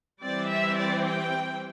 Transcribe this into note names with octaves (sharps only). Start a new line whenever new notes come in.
E3 G3 C4 D5
E5
D5
G5